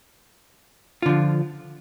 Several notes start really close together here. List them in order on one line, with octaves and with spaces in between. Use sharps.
F4 D3 F3